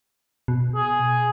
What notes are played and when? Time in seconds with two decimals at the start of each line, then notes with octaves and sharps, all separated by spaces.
0.48 B2
0.75 G#4